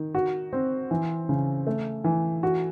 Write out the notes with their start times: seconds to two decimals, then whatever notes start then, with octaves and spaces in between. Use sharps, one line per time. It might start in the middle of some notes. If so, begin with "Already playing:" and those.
Already playing: D#3
0.15 F#4
0.53 C4
0.91 E3
1.29 C#3
1.67 A3
2.04 E3
2.43 F#4